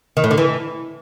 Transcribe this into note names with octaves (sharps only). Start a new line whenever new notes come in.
D#3
A2
D3
E3